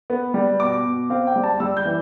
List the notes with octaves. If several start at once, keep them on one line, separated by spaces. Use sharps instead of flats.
B3
G3
B2 D6
B2
C4 F5
G5
G3
A5
G3 E6
G6
E3